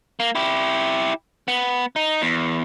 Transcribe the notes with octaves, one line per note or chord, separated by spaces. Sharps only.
A#3
E4 G4
B3
D#4
E2